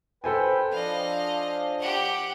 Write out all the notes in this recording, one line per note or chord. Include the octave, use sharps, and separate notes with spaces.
A4 B4 C5 G5 G#5
F3 D4 D#5 F5
G4 F#5